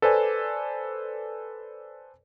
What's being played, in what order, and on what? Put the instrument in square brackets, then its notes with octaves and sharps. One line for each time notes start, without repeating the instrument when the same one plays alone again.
[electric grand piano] A4 B4 C5 D5 G#5